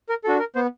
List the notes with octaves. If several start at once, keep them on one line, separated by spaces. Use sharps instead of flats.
A#4
D4 F#4 A4
A#4
B3 C5